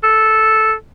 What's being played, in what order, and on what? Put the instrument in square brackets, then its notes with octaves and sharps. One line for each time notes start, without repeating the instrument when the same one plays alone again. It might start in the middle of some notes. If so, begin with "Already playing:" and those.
[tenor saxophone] A4